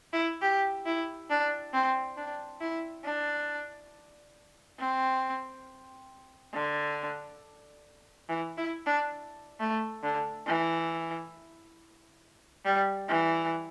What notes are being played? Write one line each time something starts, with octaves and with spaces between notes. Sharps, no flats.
E4
G4
E4
D4
C4
D4
E4
D4
C4
D3
E3
E4
D4
A3
D3
E3
G3
E3